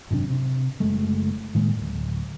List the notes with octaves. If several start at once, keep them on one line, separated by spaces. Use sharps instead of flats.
G#1 F#2 C3 D4
C3
F#1 G#3 A3
A2 D#3 G#3 A#3
D1